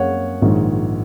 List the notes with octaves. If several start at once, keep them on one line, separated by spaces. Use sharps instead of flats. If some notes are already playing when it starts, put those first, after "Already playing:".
Already playing: F#2 A#3 C#5 F#5
A#1 G#2 D#3